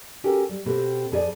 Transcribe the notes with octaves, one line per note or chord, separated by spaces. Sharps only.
C#4 F#4 G4 A4 A#4
G3
B2 C4 G4 A4
F2 C#4 G#4 A4 D5 G#5